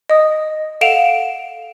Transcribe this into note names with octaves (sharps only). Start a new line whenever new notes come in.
D#5 D#6
A4 F5 F#5 D7 E7 F7